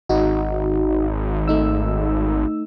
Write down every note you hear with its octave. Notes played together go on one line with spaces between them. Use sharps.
G#1 D#4 F#4
A3 D#4 E6